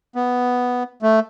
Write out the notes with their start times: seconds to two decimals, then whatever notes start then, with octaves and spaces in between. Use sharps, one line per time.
0.15 B3
1.02 A3